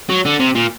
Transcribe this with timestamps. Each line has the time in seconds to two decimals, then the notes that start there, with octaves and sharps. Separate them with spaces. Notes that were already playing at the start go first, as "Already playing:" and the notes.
0.10 F#3
0.25 D3
0.40 C3
0.55 A#2